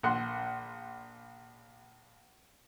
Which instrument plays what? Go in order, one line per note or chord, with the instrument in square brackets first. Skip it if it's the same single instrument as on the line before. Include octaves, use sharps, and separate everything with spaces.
[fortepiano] A#1 F#5 C6